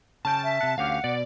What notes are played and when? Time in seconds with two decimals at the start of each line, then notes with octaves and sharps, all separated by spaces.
0.25 C#3 C#4 G5 A5
0.44 E5
0.61 C3 F#5
0.78 D2 C#4 G4 F5 F#5
1.04 B2 D5